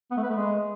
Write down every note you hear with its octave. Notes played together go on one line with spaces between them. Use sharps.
B3
A3
B4
A3
G#3